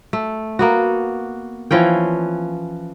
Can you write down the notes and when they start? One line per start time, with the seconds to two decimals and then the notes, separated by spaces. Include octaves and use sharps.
0.13 A3
0.59 A#3 B3 F#4
1.71 E3 F3 C#4 G5